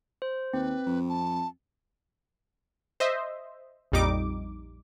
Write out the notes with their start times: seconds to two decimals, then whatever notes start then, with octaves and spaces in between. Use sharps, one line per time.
0.22 C5
0.53 D#2 C4 B4
0.86 F2
1.09 A5
3.00 C5 D#5 E5
3.92 A#1 F2 G3 D#4 D6